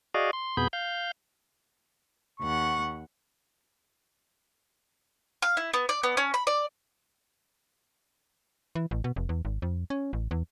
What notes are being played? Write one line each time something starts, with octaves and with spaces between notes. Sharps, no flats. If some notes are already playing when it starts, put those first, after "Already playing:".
F#4 G#4 D5 D#5 F5
C6
F2 B2 B3 G#4 B5 G6
F5 G6
D#2 F#5 C#6
F5
E4
B3
D5
B3
C#4
B5
D5
E3
A1
B2
F1
E2
G#1
F2
C#4
A1
E2